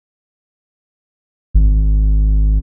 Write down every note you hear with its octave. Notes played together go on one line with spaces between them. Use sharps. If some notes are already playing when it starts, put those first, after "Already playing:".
G#1